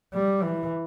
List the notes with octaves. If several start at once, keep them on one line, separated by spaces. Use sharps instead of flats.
G3
E3